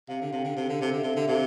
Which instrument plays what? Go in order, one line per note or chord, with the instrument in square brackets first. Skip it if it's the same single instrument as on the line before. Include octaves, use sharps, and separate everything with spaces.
[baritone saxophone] C3 [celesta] F5
[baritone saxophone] D3
[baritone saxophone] C3 [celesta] F5
[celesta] G5
[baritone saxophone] D3
C3
[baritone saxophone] D3 [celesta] F5
[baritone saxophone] C3
D3
[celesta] E5
[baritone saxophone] C3
D3
[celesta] E5
[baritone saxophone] C3 [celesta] F5